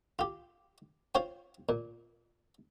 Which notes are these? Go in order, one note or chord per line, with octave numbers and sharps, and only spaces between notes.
F4 G4
F4 C5 C#5 G5
A#2